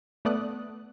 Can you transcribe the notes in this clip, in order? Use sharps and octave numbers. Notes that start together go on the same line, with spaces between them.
A3 B3 D5 D#6 F#6